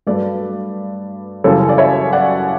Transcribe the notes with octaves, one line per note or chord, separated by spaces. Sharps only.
G2 F#3 A3 B4 D5
F#2 C#3 E3 G3 A4 C#5
D5
C#5 E5
D5 F#5